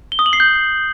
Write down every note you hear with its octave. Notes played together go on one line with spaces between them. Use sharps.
G7
D#6
F#7
C7
G6